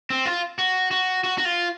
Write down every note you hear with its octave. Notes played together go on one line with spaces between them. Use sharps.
C4
F4
F#4
F#4
F#4
F#4
F4